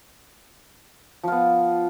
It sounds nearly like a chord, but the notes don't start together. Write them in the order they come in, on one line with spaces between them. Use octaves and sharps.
F3 F4 B3